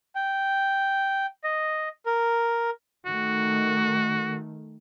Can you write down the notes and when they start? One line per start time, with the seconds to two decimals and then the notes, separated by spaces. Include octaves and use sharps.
0.15 G5
1.44 D#5
2.06 A#4
3.06 D#3 A3 F#4